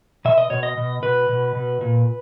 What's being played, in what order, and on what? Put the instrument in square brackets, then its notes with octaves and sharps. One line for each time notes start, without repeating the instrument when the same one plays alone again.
[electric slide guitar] B2 E5
D#5
B2 C#5
D#5
B2
B2 B4
B2
B2
A#2